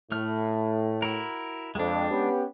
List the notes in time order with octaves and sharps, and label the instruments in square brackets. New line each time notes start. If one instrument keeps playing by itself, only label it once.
[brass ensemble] A2 [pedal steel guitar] A3 F6
[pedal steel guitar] E4 F#4 A#4
[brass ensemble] F2 [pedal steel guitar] G#3 D4
[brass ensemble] B3 C#4 G4